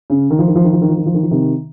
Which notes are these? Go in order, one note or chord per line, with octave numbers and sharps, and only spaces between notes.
C#3
D#3
F3
D#3
F3
D#3
F3
D#3
F3
D#3
F3
D#3
F3
C3 D#3